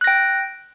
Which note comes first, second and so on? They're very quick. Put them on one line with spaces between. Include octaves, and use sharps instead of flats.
F#6 A#6 G5